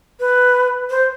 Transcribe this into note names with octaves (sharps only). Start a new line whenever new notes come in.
B4
C5